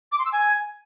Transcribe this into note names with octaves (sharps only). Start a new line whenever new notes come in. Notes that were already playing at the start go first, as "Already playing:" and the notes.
D6
C6
E6
G#5